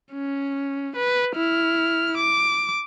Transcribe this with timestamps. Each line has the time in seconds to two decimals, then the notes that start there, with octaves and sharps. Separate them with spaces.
0.13 C#4
0.96 B4
1.36 E4 F6
2.17 D6